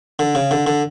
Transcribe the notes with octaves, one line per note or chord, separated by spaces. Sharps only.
D3
C#3
D3
D3